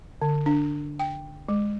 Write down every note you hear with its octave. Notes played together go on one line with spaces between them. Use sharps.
D3
D4
G5
G#3